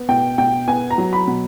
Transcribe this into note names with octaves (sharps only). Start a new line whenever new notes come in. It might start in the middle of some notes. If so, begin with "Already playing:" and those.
Already playing: B3
B2 G5
B2 G5
B3 G#5
A#5
F#3
B5
B2